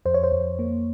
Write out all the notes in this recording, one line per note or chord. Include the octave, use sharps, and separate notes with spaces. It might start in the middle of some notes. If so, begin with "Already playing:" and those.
F2 C5
C#5
C5
F2
A#3